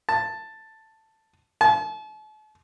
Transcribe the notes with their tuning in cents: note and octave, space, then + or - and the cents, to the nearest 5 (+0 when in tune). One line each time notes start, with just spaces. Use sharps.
A5 +5
A5 -40